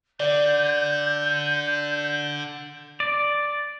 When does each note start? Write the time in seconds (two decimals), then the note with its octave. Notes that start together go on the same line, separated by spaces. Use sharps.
0.20 D3 D5 G6
3.00 D5